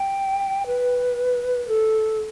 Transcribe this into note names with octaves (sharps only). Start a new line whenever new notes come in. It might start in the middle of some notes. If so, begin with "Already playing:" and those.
Already playing: G5
B4
A4